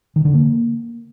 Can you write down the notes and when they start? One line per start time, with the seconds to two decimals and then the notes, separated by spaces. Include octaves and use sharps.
0.16 D#3
0.25 D3
0.34 A#3